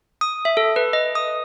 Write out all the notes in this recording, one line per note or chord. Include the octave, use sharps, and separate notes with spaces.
D#6
E5
A4
B4
D#5
D#6